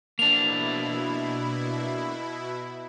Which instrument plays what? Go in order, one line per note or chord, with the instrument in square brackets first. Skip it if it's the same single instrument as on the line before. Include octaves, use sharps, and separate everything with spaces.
[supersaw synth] B2 E4 [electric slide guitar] A#3 D4 [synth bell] F7